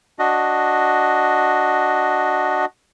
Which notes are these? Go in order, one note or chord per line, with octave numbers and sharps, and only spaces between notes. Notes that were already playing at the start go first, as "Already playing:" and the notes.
D4 F#4 D#5